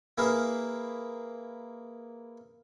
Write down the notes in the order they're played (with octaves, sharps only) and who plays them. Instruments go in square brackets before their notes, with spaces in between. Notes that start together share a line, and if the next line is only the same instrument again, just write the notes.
[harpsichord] A#3 E4 G#4 B4 F5